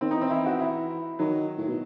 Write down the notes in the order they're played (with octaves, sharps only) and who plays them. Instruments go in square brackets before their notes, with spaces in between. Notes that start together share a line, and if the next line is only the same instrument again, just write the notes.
[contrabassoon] D#3 [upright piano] C4
[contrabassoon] E3 [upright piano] D#4
[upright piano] C4
[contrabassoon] E3 [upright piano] E4
[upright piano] F#4
E4
[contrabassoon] D#3 [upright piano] F#3
[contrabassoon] A2
B2